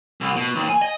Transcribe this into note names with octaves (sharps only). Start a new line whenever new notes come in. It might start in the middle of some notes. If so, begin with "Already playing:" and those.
C2
B2
D#2
G#5
D#5